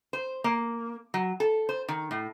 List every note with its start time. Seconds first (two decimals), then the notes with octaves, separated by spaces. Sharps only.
0.13 C5
0.44 A#3
1.14 F#3
1.40 A4
1.69 C5
1.89 D#3
2.11 A2